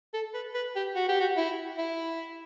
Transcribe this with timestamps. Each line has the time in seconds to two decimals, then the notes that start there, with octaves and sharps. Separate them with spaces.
0.14 A4
0.34 B4
0.54 B4
0.76 G4
0.96 F#4
1.08 G4
1.20 F#4
1.37 E4
1.78 E4